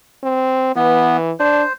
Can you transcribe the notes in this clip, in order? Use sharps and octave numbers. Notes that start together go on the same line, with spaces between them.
C4
E3 B3
D4 C5